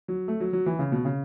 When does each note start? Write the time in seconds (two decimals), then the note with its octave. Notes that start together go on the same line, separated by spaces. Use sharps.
0.08 F#3
0.28 A3
0.40 F#3
0.53 F#3
0.66 E3
0.79 C#3
0.92 B2
1.05 C#3